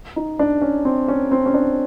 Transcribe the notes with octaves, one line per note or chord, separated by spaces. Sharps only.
D#4
D4
C#4
C4
C#4
C4
C#4
D4